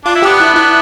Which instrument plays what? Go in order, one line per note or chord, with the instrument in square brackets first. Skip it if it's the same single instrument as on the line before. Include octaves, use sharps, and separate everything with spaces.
[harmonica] D4 [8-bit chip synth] F4
[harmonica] E4
[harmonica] B3 D4 [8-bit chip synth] G4
[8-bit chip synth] E4
E4